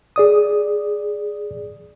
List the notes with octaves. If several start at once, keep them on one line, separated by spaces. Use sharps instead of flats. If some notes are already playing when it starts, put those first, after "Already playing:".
G#4 D5 D#6